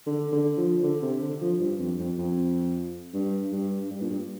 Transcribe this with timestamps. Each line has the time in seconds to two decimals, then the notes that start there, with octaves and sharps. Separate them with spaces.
0.06 D3
0.32 D3
0.57 F3
0.83 D3
1.02 C3
1.21 D3
1.41 F3
1.60 G2
1.79 F2
1.98 F2
2.18 F2
3.14 G2
3.52 G2
3.90 G2
4.01 A#2
4.10 G2